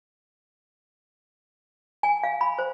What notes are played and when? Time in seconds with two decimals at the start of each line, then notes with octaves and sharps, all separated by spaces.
2.03 G#5
2.23 F5
2.41 B5
2.58 C5